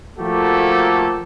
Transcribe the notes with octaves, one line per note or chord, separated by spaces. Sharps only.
F3 A3 A#3 F#4 G4 A4